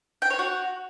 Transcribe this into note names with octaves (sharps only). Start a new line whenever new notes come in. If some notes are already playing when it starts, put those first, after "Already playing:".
G5
C#5
F#4